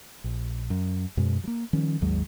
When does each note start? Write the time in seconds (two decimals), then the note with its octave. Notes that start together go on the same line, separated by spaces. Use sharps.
0.24 A#1
0.70 F#2
1.17 F#2 B2 G#3
1.44 F#3 A#3
1.73 D#3 F3 G3 C#4
2.01 G#1 D#2 F#3 G#3